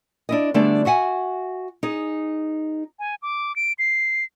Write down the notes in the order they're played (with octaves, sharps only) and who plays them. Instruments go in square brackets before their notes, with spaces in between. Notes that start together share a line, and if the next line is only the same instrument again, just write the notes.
[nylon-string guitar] D4 E4 D#5
D3 G3 A3 B3 D4 G#4
F#4 E5 F#5 G#5
D#4 G#4
[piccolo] G#5
D6
D7
C7